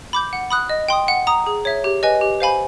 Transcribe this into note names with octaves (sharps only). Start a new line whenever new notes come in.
B5 D6 G6
F#5
B5 D#6 F#6
D#5
G5 C6 D#6
F#5
A#5 D#6
G#4
C#5 E5
G4
B4 D#5 G#5
G4
C5 F5 G#5 B5